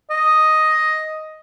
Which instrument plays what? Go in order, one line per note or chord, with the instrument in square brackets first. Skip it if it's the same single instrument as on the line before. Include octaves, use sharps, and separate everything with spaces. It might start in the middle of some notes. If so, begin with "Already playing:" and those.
[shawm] D#5